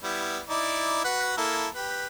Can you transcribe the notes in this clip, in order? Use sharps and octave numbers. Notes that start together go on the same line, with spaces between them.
G3 B3 E4
D#4 E4 D5
F#4 B4 F#5
A#3 E4 A4
G4 B4